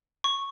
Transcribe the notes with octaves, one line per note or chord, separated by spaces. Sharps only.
C#6